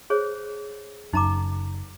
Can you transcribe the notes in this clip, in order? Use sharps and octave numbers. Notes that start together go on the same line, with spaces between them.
G#4 C5 C#5
F#1 F#2 D#4 A#5 D6